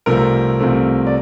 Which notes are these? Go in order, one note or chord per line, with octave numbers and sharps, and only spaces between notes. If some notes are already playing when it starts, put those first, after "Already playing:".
C2 C3 F3 A3 C4 A#4
C2 C3 F3 A3 C4
D5